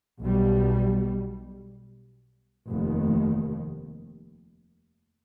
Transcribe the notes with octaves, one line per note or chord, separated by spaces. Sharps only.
B1 B2 G3
F1 D#2 D#3